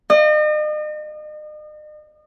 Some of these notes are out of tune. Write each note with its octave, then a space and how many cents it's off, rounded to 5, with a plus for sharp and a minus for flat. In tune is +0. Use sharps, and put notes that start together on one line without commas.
D#5 -40